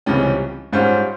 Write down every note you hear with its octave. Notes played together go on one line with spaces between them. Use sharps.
C#2 C3 E3 G3 C#4
G#2 G3 C#4 F4 C5